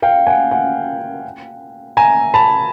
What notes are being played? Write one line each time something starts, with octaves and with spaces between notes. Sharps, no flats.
F5 G5
F#5 G#5
F#5 G#5
G#5 A#5
A5 B5